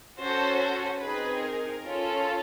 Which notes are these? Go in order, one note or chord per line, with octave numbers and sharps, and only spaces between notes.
C#4 F#4 A4 C5
C5
C4 D#4 G#4 B4
A#4
C#4 F4 A4